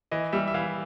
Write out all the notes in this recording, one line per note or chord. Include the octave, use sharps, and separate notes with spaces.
E3 D#5
G3 E5
E5
E3 F5